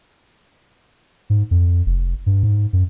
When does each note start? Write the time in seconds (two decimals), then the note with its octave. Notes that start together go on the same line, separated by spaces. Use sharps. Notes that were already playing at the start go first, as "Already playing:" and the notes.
1.30 G#2
1.51 F2
1.86 F1
2.26 G2
2.43 G#2
2.73 F#2